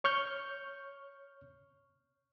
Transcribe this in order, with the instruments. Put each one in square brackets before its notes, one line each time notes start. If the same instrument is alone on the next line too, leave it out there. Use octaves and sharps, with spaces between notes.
[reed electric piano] C#5 C#6 F6 G6